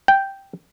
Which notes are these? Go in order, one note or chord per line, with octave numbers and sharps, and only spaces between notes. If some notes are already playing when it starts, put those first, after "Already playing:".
G5